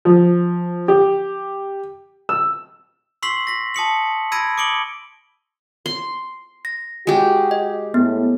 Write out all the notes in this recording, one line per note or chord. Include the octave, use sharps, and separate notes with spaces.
F3
G4
E6
C6 C#6 E6 B6 C7 F#7
A#6 B6
A5 D#6 C#7 F#7
B5 E6 G#6 A#6 D7 D#7
D6 D#6 C#7 D7 F#7 G7
C6
A#6
G#3 F#4 G4
D#5
A2 B3